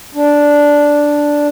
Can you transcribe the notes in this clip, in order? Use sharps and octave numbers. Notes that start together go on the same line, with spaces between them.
D4